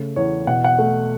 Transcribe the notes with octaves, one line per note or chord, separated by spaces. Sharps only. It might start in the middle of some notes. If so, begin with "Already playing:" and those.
Already playing: C#3 A3
E2 C#5
B2 F#5
F#5
A3